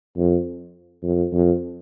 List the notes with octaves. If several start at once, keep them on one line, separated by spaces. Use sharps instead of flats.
F2
F2
F2